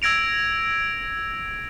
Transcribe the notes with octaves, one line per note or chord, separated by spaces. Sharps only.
E6 G#6 A#6 D7 F7